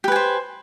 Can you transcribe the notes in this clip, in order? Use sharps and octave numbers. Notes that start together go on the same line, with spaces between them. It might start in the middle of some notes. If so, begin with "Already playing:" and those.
G4 B4 C5 G#5